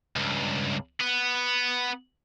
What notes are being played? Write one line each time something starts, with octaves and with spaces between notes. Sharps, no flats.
C#2 G2
B3